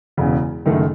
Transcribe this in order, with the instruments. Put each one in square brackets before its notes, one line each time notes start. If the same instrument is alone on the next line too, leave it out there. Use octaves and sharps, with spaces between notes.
[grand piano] E1 E2 C#3
F#1 F#2 D#3 A3